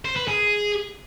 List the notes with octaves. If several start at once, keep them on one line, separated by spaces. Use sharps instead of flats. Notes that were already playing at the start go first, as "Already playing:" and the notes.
C5
B4
G#4